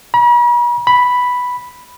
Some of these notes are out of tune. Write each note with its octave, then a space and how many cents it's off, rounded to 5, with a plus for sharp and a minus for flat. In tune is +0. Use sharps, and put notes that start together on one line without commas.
B5 -45
B5 +0